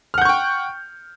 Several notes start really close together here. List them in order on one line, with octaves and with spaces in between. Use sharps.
F6 F#5 G6 C#6 G5